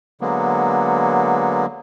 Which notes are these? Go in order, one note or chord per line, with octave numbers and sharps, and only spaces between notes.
D3 F#3 G#3 A#3 B3